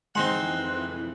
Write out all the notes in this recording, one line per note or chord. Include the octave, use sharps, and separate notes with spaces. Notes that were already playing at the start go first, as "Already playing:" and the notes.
F2 E3 G#3 C4 D#4 F#5 C6 F#6